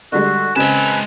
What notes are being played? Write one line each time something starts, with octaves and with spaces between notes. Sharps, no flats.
D3 G3 G#3 F#4
C#3 G#3 C4 B4 G#5 A5